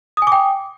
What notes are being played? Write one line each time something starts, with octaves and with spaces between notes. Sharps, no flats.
G5 G#5 D6 D#6